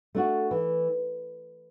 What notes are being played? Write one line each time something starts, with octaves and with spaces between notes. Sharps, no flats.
A3 D4 F#4
E3